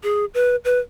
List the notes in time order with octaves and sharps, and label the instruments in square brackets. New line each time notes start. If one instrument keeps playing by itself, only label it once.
[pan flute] G#4
B4
B4